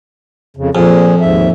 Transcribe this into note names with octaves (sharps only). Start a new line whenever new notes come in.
F2 C#3
F2 A#2 F3 G#4
D#2 G#2 E5